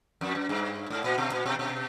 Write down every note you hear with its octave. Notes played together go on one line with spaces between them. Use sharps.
F2
F#2
G2
G#2
A#2
B2
A#2
B2
B2